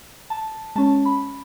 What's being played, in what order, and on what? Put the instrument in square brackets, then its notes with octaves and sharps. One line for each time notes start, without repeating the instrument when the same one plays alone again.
[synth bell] A5
G#3 C#4 A5
B5